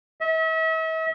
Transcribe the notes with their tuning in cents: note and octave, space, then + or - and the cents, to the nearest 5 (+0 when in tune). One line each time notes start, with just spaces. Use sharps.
E5 -40